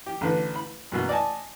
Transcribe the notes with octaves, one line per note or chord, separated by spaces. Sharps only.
G4
A1 D3 B4
B5
F#2 B2 A#3
D5 D#5 G#5 A5